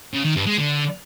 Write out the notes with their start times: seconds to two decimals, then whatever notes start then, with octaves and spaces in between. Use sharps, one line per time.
0.14 C#3
0.25 D#3
0.36 G2
0.46 G#3
0.57 D3